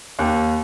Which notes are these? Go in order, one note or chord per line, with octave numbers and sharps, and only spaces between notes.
D#2